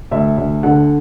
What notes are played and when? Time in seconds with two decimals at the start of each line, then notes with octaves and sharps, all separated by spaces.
0.11 D2 E5
0.38 D2
0.63 D3 F#5